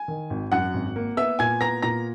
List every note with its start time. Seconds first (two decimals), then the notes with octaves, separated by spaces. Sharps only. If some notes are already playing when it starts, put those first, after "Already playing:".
Already playing: G#5
0.08 D#3
0.30 G#1
0.52 F#2 F#5 F#6
0.74 G#1
0.96 A#3
1.17 B3 E5 E6
1.39 A#2 G#5 G#6
1.61 B3 A#5 A#6
1.82 A#2 A#5 A#6